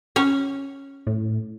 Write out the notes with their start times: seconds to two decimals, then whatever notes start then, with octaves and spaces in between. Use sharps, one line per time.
0.16 C#4 C#5
1.07 A2